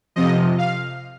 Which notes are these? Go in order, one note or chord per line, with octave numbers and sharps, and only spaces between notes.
F2 C3 F3 D#5
F5